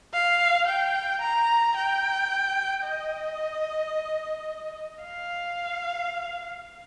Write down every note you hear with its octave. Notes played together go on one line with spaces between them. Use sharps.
F5
G5
A#5
G5
D#5
F5